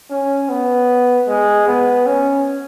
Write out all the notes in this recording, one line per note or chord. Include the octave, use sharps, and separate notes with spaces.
C#4
B3
G#3
B3
C#4